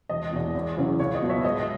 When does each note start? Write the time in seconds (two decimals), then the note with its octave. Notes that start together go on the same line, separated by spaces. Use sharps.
0.09 E1 D#5
0.32 E2 B2
0.55 E2
0.77 C#3 F#3 C#4 E4
1.00 C#2 C#5
1.15 D#5
1.21 B2 F#3 B3
1.29 C#5 E5
1.44 G#2 D#5